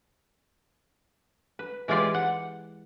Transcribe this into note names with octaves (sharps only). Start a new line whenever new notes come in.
B4
E3 G#3 E4 F4 G4 D5
F#5